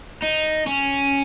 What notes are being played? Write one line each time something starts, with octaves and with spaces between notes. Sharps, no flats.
D#4
C#4